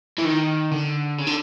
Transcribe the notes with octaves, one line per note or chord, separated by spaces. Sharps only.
E3
D#3
D3
C#3
D3